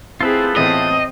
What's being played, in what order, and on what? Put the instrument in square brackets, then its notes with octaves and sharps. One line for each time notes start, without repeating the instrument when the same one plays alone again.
[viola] C4 G#4 [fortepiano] E4 [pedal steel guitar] F4 A4 B4
[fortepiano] A2 E3 B3 [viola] C4 [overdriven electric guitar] D#5